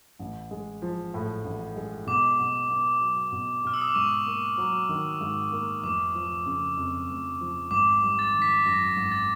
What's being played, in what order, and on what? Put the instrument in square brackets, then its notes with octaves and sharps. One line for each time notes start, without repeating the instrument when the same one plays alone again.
[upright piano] A1
G#3
F3
A2
A1
G#3
[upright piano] B2 [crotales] D6
[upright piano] B2
B3
F#3
B2
[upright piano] B2 [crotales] F6
[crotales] E6
D#6
D6
[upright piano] G#2 [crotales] C#6
[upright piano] A#3
F#3
D#3
G#2
A#3
[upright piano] F1 [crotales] D6
[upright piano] F3
C#3
F2
F1
F3
[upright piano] G#1 [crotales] D6
[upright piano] G3
[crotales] A6
[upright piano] D#3
[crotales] B6
[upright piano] F#2 [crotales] A#6
[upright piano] G#1
[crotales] A6